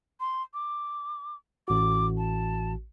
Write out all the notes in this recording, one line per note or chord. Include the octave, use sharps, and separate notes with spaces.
C6
D6
A1 F#4 D6
A5